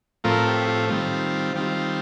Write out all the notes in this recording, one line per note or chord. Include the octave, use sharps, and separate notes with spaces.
A2 F3 A3 C4 F4 A#4
G4
F4
D#3 G3 C4 F4
D#3 G3 C4 F4